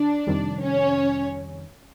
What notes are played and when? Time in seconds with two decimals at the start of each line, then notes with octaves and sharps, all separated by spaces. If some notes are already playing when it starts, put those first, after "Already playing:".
Already playing: D3 D4 D5
0.27 F2 C3 D#3 G3
0.61 C#4 C#5